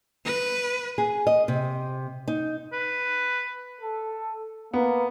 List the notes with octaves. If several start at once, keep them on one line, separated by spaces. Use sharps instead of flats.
B4
G#4
D#5
C3
D#4
B4
A4
A#3 B3